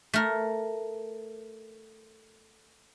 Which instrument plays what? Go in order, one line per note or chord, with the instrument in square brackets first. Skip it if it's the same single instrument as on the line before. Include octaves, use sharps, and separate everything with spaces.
[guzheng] A3 A#4